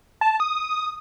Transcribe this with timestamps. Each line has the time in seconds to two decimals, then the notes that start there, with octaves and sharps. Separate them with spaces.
0.21 A5
0.40 D#6